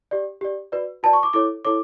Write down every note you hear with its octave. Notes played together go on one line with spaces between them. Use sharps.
G4 D5
G4 D5
F#4 B4 D5
F#4 B4 D5 A5
C#6
D6
E4 A4 C#5 D6
E4 A4 C#5 D6